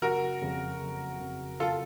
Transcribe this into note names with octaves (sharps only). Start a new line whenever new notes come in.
F#1 F#4 A#4
F2 C#3
F#1
F2 C#3
F#1 F4 A4